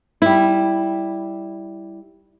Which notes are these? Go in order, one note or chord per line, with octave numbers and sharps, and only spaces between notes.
G3 E4